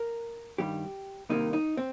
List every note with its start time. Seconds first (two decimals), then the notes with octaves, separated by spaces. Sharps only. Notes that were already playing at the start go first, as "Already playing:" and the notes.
Already playing: A#4
0.58 G2 D#3 G3 G4
1.29 C2 C3 D#3 G3 A#3 D#4
1.53 D#4
1.77 C4